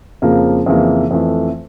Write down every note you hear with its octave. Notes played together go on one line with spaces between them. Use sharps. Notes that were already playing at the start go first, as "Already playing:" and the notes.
F2 C#3 F3 A#3
F2 C#3 E3 A#3
F2 E3 A3